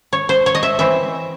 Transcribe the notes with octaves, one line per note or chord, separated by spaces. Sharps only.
C#5
C5
C#5
D#5
E5
E3 C4 E5